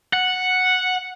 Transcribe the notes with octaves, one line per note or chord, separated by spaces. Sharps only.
F#5